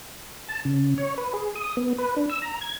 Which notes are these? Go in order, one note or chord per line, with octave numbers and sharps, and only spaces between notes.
A5
C#3
C#5
B4
G#4
D#6
B3
B4
D4
E6
A#5
G#6